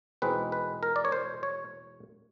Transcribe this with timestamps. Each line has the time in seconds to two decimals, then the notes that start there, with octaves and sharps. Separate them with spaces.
0.22 E2 B2 G#3 C4 D#4 B4
0.52 B4
0.83 A#4
0.96 D5
1.05 C#5
1.12 C5
1.43 C#5